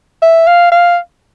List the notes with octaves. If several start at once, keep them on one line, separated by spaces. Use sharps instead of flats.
E5
F5
F5